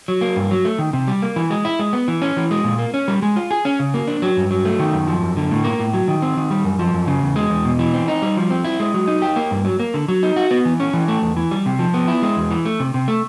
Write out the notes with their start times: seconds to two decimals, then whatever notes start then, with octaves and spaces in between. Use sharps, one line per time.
0.08 F#3
0.21 A#3
0.36 G2
0.51 F#3
0.65 A3
0.79 D#3
0.93 C3
1.08 G3
1.22 A#3
1.36 E3
1.50 G#3
1.65 E4
1.79 G#3
1.93 B3
2.08 E3
2.22 C#4
2.37 E3
2.51 G#3
2.64 A#2
2.79 A#3
2.94 C#4
3.08 G3
3.22 G#3
3.36 F4
3.51 G#4
3.65 C#4
3.79 C#3
3.94 A#3
4.07 D4
4.22 F#3
4.37 G2
4.51 F#3
4.65 A3
4.80 D#3
4.94 F#2
5.08 F3
5.23 F#2
5.37 D3
5.51 A2
5.64 A#3
5.80 A2
5.94 F#3
6.08 D#3
6.22 C4
6.37 D#3
6.51 G3
6.65 F#2
6.79 F3
6.93 F#2
7.07 C#3
7.22 E2
7.36 G#3
7.50 E2
7.65 B2
7.79 E3
7.94 C4
8.08 D#4
8.22 G3
8.37 F3
8.50 C4
8.65 E4
8.80 G#3
8.94 F#3
9.08 D#4
9.22 G4
9.36 A#3
9.51 G2
9.65 F#3
9.80 A#3
9.94 D3
10.08 F#3
10.23 D#4
10.36 F#4
10.51 B3
10.65 E3
10.80 C#4
10.94 E3
11.08 A3
11.22 E2
11.37 E3
11.51 G3
11.66 C3
11.79 F3
11.94 B3
12.08 E4
12.22 G#3
12.37 E2
12.51 E3
12.65 A3
12.80 C3
12.94 C3
13.08 A3